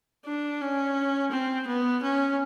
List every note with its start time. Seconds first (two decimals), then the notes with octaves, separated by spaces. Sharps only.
0.26 D4
0.61 C#4
1.31 C4
1.67 B3
2.03 C#4